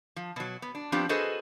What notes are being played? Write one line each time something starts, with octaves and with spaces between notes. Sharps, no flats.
F3
B2 F#3
B3
D4
F3 B3 C4 D4 G4
F#4 G#4 A4 B4 C5 D#5